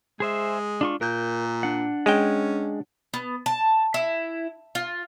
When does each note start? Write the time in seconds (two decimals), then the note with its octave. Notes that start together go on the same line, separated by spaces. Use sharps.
0.20 G#3 G#4 C5 E5
0.81 D4 F4 C#6
1.01 A#2 A#4 G6
1.63 D4 F#5
2.06 G#3 C#4 G5
3.14 B3
3.46 A5
3.94 E4
4.75 F4